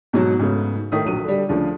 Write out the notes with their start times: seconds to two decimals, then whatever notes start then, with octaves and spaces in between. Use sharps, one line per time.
0.13 G#2 B2 F#3
0.39 G#2 C#3 A3 B3
0.92 A2 D#3 A3 D#6 B6
1.05 A#1 F#3 D#7
1.24 D3 G3
1.49 D2 C#3 F3